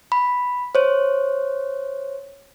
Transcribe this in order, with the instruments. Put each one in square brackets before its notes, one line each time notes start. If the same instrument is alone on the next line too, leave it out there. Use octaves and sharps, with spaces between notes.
[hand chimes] B5
C5 C#5